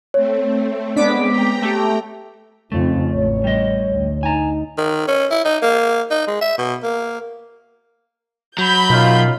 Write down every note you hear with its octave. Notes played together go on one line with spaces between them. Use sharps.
A3 C4 C#5
G#3 B3 C4 D4 D6 B6
G5 A#5
A3 G4
F2 C#3 A3 C#4 D#4 F4
A1 C#5
G3 D#5
D2
D#4 G#5 A#5
D#3
C#4
E4
D#4
A#3
D#4
G#3
E5
B2
A#3
F#3 B5 G6
F#2 B2 D#4 F4